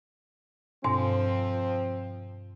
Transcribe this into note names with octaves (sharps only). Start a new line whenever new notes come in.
G2 B2 F3 C4 D4